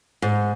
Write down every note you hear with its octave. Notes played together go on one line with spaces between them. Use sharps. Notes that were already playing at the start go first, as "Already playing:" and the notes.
G#2